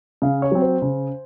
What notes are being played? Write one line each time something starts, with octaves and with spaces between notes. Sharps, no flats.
C#3 F5
C#5
F#3 C4
C5
C#3